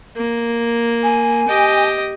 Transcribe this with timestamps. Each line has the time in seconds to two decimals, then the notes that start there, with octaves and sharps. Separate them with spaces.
0.16 A#3
1.03 G#5
1.48 G4 D#5